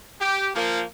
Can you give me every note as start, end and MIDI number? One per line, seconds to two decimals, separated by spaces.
0.20 0.48 67
0.54 0.82 53
0.54 0.82 58